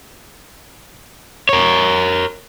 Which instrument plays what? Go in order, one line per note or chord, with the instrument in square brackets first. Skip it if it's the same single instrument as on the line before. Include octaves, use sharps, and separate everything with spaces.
[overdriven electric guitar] A#4 C#5